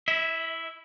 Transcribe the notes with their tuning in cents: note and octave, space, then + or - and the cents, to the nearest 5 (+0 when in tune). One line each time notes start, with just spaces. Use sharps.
E4 +0 E5 -30